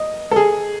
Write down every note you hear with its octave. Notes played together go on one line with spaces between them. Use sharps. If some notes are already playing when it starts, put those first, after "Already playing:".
Already playing: D#5
A4
G#4